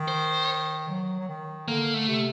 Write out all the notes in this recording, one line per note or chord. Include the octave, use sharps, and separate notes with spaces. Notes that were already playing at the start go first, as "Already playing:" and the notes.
Already playing: D#3
C5
F#3
F#3
D#3
D3 A#3
A3
C3